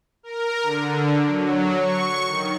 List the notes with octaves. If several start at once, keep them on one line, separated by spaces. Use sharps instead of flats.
A#4
D3
F#3
C#6
D#3